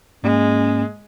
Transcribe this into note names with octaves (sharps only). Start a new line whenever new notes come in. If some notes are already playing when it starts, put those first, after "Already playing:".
G#2 G#3 A#3 C#4